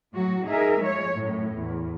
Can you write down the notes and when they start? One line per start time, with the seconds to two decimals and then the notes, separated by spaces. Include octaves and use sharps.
0.13 A2 F#3 F#4
0.46 D#4 G#4 A#4 E5
0.79 F3 G#3 C#5
1.14 F#2 A2
1.56 E2